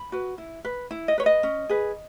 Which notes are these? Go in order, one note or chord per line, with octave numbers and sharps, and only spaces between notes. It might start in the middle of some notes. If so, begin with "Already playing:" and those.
Already playing: B5
F#4 B4
E4
B4
E4
D#5
B4 C#5
D#5
C#4
G#4 B4